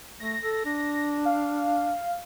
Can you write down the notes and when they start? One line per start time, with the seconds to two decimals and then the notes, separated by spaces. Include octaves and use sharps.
0.20 A3 A#6
0.43 A4
0.65 D4
1.25 F5